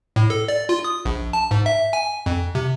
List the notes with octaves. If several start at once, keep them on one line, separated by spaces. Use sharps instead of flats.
A2
A4
D5
F4
D#6
A#1
A5
G#2
E5
G#5
F2
C3